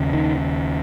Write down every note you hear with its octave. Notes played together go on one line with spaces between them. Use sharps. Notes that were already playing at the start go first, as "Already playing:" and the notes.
Already playing: D#2 C#3
D#3